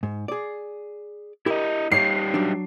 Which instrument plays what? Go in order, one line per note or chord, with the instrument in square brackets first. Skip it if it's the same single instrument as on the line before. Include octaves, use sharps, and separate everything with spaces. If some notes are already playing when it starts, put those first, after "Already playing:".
[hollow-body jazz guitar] G#2
G#4 D5
[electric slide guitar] E4 D#5 [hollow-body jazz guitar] G4 A#4
[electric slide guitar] G3 D#4 G4 [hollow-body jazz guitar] C#5 D5 [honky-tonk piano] C7
[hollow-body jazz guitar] F#3 D4